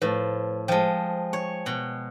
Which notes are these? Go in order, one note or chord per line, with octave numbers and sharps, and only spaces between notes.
A2 F3 B4 C5
F3 G#3 G5 A5
C#5
B2